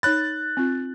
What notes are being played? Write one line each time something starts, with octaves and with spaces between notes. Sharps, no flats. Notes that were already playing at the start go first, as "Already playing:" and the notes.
D#4 C#5 B5 F#6 A6
C4 F4